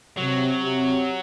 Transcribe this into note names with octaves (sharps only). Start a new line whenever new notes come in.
C3 F#3
C3